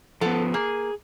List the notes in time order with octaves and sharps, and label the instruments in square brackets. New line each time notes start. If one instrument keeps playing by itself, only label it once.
[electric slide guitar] F3 B3 [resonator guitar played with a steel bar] A4 F#5
[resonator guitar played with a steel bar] A#3 [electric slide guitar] G#4